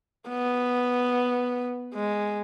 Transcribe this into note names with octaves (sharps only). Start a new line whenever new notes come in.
B3
G#3